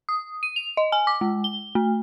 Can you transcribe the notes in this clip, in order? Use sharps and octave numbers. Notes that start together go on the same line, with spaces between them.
D#6
D#7
F7
D#5
G#5
D6
G#3
G7
A3